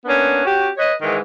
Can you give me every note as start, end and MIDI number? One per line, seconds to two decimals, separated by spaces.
0.05 0.44 58
0.05 0.44 59
0.05 0.44 61
0.05 0.44 62
0.45 0.68 61
0.45 0.68 66
0.45 0.68 67
0.78 0.93 71
0.78 0.93 73
0.78 0.93 75
1.01 1.18 44
1.01 1.18 51
1.01 1.18 52
1.01 1.18 56